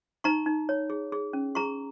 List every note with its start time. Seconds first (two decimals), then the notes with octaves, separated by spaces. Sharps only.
0.24 D#4 A#5 C#6
0.46 D#4
0.69 C#5
0.90 G#4
1.12 G#4
1.33 C#4
1.55 G#4 A#5 C#6